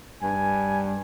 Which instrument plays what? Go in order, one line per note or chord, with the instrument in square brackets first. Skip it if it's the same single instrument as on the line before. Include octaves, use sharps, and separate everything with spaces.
[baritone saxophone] G2 [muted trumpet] G#5